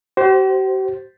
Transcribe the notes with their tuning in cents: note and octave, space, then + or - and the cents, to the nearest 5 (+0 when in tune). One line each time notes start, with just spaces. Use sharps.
G4 -45 C5 +0